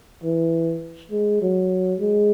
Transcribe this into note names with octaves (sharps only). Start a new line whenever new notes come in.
E3
G#3
F#3
G#3